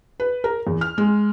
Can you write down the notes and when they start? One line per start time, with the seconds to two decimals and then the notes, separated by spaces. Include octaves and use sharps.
0.20 B4
0.44 A#4
0.67 E2
0.81 F6
0.98 G#3